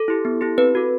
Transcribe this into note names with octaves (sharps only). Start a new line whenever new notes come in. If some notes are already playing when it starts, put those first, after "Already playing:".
Already playing: A4
E4 G4
B3
E4 G4
C4 B4
F#4 A4